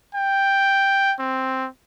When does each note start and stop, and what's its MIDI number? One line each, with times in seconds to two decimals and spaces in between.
0.15 1.14 79
1.19 1.67 60